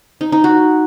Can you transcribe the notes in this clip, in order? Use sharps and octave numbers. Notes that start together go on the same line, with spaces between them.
D#4
D#4
F#4